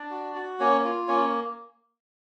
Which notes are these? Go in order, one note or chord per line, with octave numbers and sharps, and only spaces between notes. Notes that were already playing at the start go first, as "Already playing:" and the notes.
Already playing: D4 D5
F#4
F#4
A#3 C#4 C#5
F4
A#3 C#4 C#5